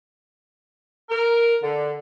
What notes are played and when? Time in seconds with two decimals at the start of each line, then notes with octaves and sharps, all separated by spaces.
1.09 A#4
1.62 D3